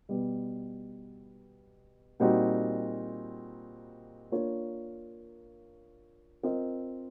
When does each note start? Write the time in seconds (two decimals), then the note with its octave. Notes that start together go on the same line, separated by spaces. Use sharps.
0.09 B2 G3 B3
2.20 A#2 G3 C4 D#4 F#4
4.32 A#3 D4 F4 A#4 C#5
6.43 C4 F4 A#4 D#5